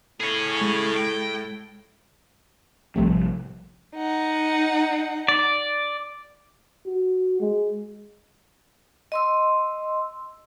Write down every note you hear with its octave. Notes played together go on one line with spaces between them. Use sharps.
A2 G#4 C#5
G#3
G5
A#1 A2 C3 F3 G3 A3
D#4 F#5
D5
F#4
G#3
D#5 C6 E6